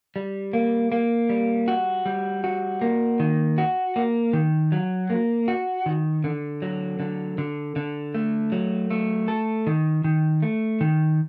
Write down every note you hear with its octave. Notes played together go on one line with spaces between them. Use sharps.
G3
A#3
A#3
G3
F#4
G3
F#4
A#3
D#3
F#4
A#3
D#3
F#3
A#3
F#4
D#3
D3
F#3
D3
D3
D3
A3
F#3
A3
A4
D#3
D#3
A3
D#3